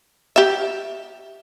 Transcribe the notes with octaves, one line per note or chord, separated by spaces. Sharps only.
G4 E5